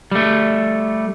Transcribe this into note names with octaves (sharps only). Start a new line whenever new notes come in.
G3 A3